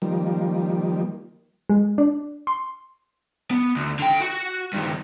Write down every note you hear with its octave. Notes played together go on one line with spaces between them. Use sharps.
D#3 F3 G3 A#3
G#3
D4
C6
B3
D2
D3 G5
F#4 F#5
G2 D#3